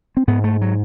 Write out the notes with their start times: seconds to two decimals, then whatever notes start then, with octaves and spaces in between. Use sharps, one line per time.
0.17 C4
0.28 G#2 B3
0.44 A3
0.61 F#3